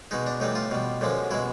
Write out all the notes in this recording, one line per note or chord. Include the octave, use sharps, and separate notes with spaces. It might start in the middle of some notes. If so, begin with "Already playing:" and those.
B2 G#3 D#4
D4
A2 E3 G3 D#4
F4
B2 G3
F#2 D3 F3 G#3
B2 G#3 E4